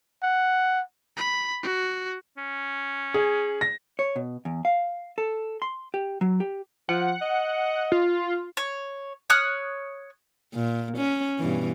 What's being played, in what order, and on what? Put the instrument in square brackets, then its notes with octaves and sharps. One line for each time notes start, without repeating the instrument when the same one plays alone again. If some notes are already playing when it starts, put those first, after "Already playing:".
[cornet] F#5
[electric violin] B5
F#4
[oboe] C#4
[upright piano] G#4
A#6
[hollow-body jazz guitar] C#5
B2
E2
F5
A4
C6
G4
F#3
G4
[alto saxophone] F3 [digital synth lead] F#5
[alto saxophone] D#5
[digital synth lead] F4
[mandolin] C#5
C#5 D#6 F6 F#6
[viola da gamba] A#2
C#4
G2 B2 E3